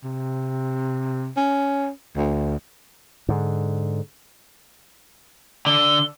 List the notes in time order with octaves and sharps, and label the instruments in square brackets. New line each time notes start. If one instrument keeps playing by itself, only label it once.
[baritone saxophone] C3
C#4
D2
[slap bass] G#2 D3
[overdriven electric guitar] D3 [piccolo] G7